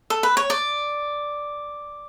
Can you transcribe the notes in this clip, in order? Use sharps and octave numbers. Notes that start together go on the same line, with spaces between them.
A4
B4
C#5
D5